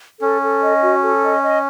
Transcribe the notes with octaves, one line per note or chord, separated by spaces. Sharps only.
C#4 A4
A4
D#5
F#4
A4
D#5
D#5